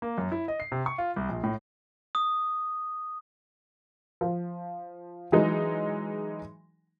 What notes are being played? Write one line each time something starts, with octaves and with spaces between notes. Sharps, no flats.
A#3
F#2
E4
D#5
C7
C3
C#6
F4
C2
A#1
A2
D#6
F3
E3 F#3 G#3 D#4